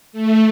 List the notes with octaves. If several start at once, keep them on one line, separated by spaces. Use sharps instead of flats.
A3